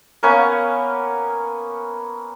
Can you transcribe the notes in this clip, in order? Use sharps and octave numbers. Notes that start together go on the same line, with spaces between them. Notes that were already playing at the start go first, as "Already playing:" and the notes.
A#3 B3 C#4 A#4